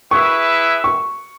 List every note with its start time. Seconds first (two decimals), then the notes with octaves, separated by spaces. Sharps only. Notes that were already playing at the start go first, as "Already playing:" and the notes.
0.11 E4 G#4 B4 E5 C#6
0.84 C#6